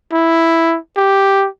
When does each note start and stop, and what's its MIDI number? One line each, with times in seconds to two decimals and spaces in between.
0.13 0.78 64
0.97 1.47 67